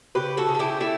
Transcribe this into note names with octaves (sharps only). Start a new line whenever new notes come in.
C#3 G4 B4
F#4 A4
C#3
A4
E4 G4
A3 E4 G4